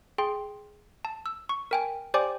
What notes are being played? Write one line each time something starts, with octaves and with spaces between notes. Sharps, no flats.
G#4 G5 C6
A5
E6
C#6
A#4 G5 G#5
G4 C5 D5 G5 G#5 D6